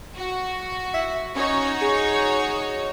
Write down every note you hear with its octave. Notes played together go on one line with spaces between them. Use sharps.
F#4
E5
C#4 D#4 F#4 C#5
G#4